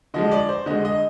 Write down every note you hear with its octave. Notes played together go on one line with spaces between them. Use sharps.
D3 F3 G#3 D#5
D5
C5
D3 G#3 D#5
D#5